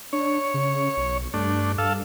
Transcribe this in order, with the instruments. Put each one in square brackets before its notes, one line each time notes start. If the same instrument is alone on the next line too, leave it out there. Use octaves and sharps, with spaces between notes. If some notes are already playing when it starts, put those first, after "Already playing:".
[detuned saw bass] D4 [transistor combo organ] C#5
[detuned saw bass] C#3
B1
[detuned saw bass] G2 [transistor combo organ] A3 D4
[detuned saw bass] G2 [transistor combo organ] A4 F5 E6